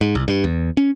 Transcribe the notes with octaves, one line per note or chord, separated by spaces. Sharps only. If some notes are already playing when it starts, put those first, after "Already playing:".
G#2
C2
G2
E2
C#4